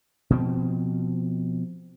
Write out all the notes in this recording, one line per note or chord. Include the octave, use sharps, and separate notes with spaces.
B2 F3 C4